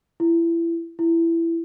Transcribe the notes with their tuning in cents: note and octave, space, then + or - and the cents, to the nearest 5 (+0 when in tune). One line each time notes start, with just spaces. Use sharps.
E4 +25
E4 +15